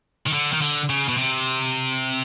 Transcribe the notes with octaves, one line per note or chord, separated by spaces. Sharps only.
D#3
D3
D#3
D3
C#3
B2
C3